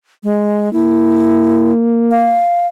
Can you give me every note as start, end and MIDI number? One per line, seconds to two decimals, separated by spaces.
0.23 0.72 56
0.73 2.40 58
0.73 1.72 64
2.11 2.67 77